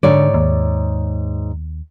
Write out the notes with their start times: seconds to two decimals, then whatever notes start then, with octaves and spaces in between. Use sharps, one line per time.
0.03 G#2 D3 C#5 D5
0.34 D#2